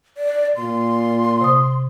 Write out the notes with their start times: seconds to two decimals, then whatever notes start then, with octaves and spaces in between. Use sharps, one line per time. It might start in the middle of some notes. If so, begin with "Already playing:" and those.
0.17 D5
0.56 A#2 C6
1.41 C3 D#6